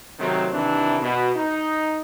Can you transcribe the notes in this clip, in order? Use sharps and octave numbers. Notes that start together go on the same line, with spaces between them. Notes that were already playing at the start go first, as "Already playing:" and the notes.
C3 D#3 F#3 A3 C4
C3 D#3 E3 D4
B2
D#4